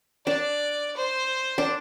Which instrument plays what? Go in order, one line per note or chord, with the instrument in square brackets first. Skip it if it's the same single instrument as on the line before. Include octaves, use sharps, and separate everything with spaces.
[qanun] D4 [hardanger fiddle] D5
[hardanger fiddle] C5
[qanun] D4